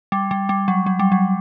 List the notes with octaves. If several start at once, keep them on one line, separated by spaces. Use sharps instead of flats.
G3
G3
G3
F#3
F#3
G3
F#3